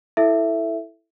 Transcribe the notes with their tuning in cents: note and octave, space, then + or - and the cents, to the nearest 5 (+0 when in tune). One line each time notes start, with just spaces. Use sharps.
E4 +0 A4 +0 E5 +5